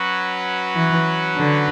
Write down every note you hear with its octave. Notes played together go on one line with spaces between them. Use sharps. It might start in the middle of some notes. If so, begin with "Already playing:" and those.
Already playing: F#3 C#4 F#4 B4
E3
D3